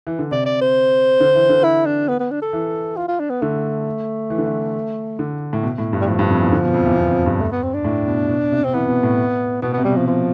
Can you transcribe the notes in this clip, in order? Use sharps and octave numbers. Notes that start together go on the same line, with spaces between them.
E3
D3
C3 D5
D5
C5
D3
E3
D3
E4
D4
B3
B3
D4
A4
E3
F4
F4
D4
B3
D3 A3
E3
D3
E3
D3
A2
B2
A2
G2
G3
A2 F3
G2
F2
E2
D3
B2
F2
E2
E2
F2
G2
A3
B3
C4
D4
A2
B2
B2
C3
C4
E3 B3
B2
A2
B2 B3
C3 B3
G3
C3 F3
F3